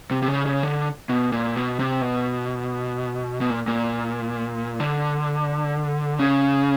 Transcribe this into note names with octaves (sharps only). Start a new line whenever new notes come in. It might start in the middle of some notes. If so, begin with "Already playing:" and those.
C3
C3
C#3
C#3
D3
B2
A#2
B2
C3
B2
B2
A#2
A#2
D3
C#3